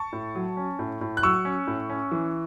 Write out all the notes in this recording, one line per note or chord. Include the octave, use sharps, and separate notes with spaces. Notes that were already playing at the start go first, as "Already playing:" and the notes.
Already playing: A5 C#6
A2
F#3
C#4
A2
A2
F#6
F#3 C#6 E6
C#4
A2
C#4
E3